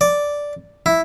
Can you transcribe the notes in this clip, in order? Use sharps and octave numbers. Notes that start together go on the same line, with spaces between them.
D5
E4